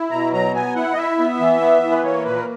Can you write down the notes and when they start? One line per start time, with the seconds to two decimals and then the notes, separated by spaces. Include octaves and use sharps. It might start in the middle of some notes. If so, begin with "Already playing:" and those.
Already playing: E4
0.11 B2 A#5
0.33 F#3 A#5
0.54 B3 G#5
0.75 E4 F#5
0.93 D#5
0.96 E4 E5
1.19 B3
1.40 E3
1.61 B3
1.82 E3
1.91 B4
2.03 A#3 C#5
2.25 A#2 B4
2.36 A#4